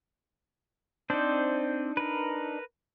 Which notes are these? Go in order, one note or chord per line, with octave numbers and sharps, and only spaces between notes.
C4 D4 D#4 C5 D5
A#4 B4